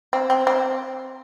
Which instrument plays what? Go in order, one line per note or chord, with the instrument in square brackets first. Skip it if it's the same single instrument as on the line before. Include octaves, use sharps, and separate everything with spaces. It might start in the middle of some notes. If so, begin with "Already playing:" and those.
[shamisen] C4
C4
C4